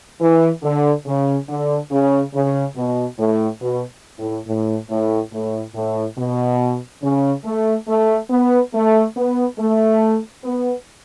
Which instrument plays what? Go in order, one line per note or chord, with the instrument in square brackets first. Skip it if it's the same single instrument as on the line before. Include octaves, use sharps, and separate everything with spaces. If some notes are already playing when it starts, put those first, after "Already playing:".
[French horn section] E3
D3
C#3
D3
C#3
C#3
B2
A2
B2
A2
A2
A2
A2
A2
B2
C#3
A3
A3
B3
A3
B3
A3
B3